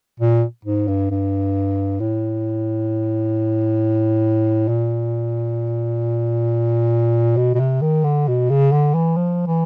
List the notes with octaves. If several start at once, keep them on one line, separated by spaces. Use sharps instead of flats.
A#2
G#2
G2
G2
A2
A#2
B2
B2
C3
D#3
D3
B2
C#3
D3
E3
F3
E3